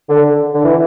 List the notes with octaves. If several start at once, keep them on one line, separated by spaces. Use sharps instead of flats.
D3
D3
E3